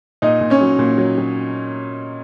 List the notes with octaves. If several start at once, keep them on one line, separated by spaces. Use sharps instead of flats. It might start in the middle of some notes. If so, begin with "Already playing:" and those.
A#2 D#4 D#5
A#2
C#4 C#5
F#3
A#2
F#3
F#3